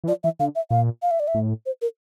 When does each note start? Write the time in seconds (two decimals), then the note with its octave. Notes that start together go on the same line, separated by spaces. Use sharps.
0.04 E3
0.08 F3 D5
0.24 E3 E5
0.40 D3 F5
0.56 E5
0.71 A#2 F5
1.02 F5
1.11 E5
1.20 D5
1.28 E5
1.34 A2
1.66 C5
1.82 A#4